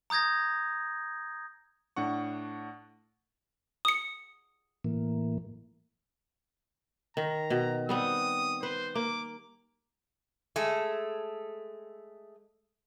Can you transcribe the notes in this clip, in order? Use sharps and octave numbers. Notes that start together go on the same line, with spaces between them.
A#5 D#6 G6 G#6 A#6
A2 D4 F#5 C#6
D#6 C#7
A2 E3 A#3
D#3 A#5
B2
G3 B3 C4 D#6
B4 C5
A#3 D6
G#3 A3 A4